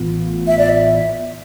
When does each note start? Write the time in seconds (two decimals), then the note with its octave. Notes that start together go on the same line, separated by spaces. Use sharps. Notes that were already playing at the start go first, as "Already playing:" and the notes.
Already playing: A1 A2 E3 B3 F4
0.48 E5
0.59 D5
0.69 E5